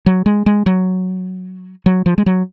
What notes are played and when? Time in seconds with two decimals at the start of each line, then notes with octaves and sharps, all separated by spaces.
0.06 F#3
0.26 G#3
0.46 G#3
0.66 F#3
1.86 F#3
2.06 F3
2.18 G#3
2.26 F#3